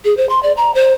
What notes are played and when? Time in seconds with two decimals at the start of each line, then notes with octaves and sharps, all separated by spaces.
0.05 G#4
0.17 C5
0.29 C6
0.43 D5
0.57 A#5
0.75 C5